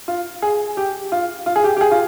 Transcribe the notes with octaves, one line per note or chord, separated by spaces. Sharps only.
F4
G#4
G4
F4
F4
G#4
G4
G4
G#4
F4